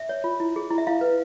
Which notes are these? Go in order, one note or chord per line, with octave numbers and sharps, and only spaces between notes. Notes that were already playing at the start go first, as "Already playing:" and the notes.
Already playing: E5
C#5
F4
E4
G#4
E4
E5
E4 F5
B4